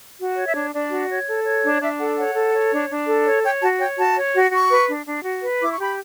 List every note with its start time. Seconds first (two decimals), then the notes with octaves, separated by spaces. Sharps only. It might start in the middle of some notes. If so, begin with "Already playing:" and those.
0.18 F#4
0.36 C#5
0.46 E5
0.55 D4
0.73 D4 D5
0.91 F#4
1.09 C#5
1.27 A4
1.45 C#5
1.63 D4
1.81 D4 E5
1.99 A4 F#5
2.17 C#5 F#5
2.35 A4
2.54 C#5
2.72 D4
2.90 D4
3.07 A4
3.25 C#5
3.44 C#5 G5
3.62 F#4 A5
3.79 C#5 G5
3.98 F#4 A5
4.16 C#5
4.34 F#4
4.52 F#4 C#6
4.70 B4
4.89 D4
5.06 D4
5.24 F#4
5.42 B4
5.60 E4 D6
5.71 C#6
5.79 G4 B5